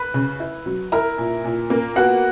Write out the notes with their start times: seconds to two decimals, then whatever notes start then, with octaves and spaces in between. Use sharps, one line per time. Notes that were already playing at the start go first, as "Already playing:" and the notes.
Already playing: B4 B5
0.14 C#3
0.40 E4
0.66 F#3
0.92 E4 A#4 A#5
1.18 A#2
1.44 A#2
1.70 A#3
1.96 B3 F#4 F#5